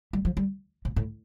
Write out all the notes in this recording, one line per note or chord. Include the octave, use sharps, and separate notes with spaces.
G3
F3
G3
A#2
A2